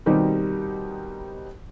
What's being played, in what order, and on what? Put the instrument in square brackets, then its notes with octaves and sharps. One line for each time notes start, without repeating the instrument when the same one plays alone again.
[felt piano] B2 D#3 G3 C4 D#4 G4